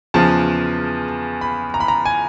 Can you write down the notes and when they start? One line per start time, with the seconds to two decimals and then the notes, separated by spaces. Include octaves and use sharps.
0.14 E2 C#3 F3 A5
1.41 B5
1.74 A#5
1.80 B5
1.88 A#5
2.05 G#5